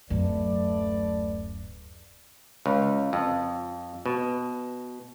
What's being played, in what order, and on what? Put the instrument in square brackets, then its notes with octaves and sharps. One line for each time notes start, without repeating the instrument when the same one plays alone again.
[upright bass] D1 F#2 [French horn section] A3 B4 D5
[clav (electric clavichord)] C#2
F2
B2